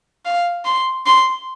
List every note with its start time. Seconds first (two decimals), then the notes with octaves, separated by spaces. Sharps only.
0.26 F5
0.65 C6
1.06 C6